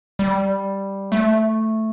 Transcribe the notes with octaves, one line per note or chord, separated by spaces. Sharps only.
G3
A3